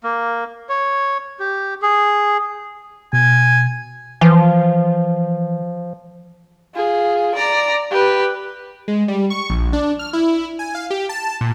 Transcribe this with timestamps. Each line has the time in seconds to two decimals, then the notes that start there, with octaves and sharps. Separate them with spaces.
0.04 A#3
0.69 C#5
1.40 G4
1.82 G#4
3.13 B2 G#5
4.21 E3 F3
6.75 F4 G#4
7.35 D5 A#5
7.91 G4 B4
8.88 G#3
9.08 G3
9.30 C#6
9.50 A#1
9.73 D4
9.99 F6
10.13 E4
10.59 G#5
10.75 F5
10.90 G4
11.09 A5
11.41 A#2